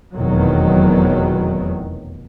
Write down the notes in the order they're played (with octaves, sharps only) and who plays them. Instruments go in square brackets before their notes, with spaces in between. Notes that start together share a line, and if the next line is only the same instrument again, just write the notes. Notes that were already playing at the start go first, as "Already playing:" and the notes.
[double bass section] F1 E2 B2 D#3 F#3